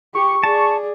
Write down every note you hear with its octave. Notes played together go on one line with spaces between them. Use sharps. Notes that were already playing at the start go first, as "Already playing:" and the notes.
G4 C#6
G#4 D5 A5